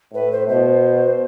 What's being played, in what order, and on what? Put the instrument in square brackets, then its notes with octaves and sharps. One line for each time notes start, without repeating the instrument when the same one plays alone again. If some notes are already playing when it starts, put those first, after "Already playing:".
[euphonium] A2 [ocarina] B4
[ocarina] C5
[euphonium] B2 [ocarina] C5